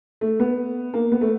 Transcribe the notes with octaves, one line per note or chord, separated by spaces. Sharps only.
A3
B3
A#3
B3
A3